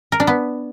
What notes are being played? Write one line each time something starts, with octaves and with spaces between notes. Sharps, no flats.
A#4
D4
B3